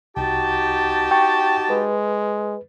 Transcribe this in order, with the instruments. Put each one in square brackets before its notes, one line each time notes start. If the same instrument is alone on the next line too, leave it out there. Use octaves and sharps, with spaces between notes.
[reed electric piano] C2 [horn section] D#4 F#4 G4 [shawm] A5
[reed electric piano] G5 C#6
[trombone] G#3 [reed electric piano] B4